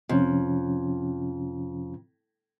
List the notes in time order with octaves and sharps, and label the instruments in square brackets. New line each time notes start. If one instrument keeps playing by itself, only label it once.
[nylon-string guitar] F2 [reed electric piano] C3 F3 C#4